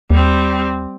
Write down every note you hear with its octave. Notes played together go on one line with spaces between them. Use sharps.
D#2 G3 C4